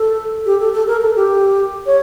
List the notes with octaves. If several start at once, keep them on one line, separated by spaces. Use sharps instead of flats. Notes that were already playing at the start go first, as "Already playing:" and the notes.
Already playing: A4
G4
A4
A4
A#4
A4
G4
C#5